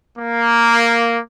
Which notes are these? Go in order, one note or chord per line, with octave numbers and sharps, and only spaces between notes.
A#3